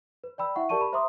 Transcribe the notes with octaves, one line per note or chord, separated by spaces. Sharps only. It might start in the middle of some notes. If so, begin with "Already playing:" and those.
B4
D5 G5 B5 E6
E4 E5 F#5 C#6
G4 A#4 D5 A5 C#6 D#7
B5
C5 E5 A#5 C6 D6 D#6